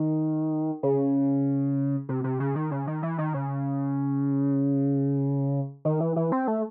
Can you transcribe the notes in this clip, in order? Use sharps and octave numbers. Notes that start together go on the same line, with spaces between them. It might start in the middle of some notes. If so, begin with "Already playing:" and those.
Already playing: D#3
C#3
C3
C3
C#3
D#3
C#3
D#3
E3
D#3
C#3
D#3
E3
E3
C4
A3